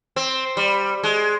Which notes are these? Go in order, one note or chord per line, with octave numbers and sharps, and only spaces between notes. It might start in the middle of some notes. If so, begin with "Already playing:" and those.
C4
G3
G#3